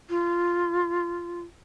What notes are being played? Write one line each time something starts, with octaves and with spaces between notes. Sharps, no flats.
F4